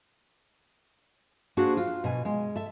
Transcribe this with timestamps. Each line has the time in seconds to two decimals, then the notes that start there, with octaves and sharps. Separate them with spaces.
1.57 A#3 D4 F#4 G#4 C5
1.77 F4
2.04 B2 G#5
2.25 G#3
2.56 A4 E5